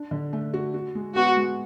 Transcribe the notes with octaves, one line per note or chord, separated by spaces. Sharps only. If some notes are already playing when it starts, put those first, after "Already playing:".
Already playing: D4
D3
A3
F#4
F#4
G#3
B3 F#4
G#3